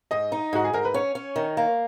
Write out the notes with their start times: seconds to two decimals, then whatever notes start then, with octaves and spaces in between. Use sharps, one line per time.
0.11 G#2 D#5
0.32 D#4
0.53 G#2 F#4
0.64 G#4
0.73 G#2 A#4
0.85 B4
0.94 C#4 C#5
1.15 C#4
1.36 D#3
1.57 A#3